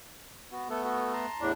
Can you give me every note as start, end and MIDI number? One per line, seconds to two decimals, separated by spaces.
0.52 0.68 59
0.52 0.68 66
0.70 1.26 57
0.70 1.26 59
0.70 0.82 69
0.84 1.13 66
0.84 1.13 69
1.13 1.49 81
1.13 1.49 82
1.13 1.49 84
1.40 1.52 40
1.40 1.52 45
1.40 1.52 62